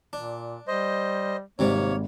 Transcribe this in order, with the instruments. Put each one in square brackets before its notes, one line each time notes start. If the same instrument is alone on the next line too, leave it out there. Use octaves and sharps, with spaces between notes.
[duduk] A#2 [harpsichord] D4
[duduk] G3 [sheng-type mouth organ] C5 D#5
[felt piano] G#1 [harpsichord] G#2 C3 G3 [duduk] A#3 [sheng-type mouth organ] C#5